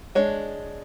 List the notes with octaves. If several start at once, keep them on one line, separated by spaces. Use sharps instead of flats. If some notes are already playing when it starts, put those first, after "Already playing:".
G#3 D4 C#5